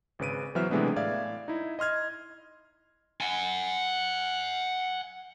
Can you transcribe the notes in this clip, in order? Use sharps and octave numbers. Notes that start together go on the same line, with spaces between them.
G#1 C#3 B4 D7 D#7
E3 F#3 B3 C5 E5 F6
C3 E3 G#3 A3 B3 D4
A2 D5 E5 F5 G#6
D#4 E4
D#5 C6 F6 G#6
F#5 G#5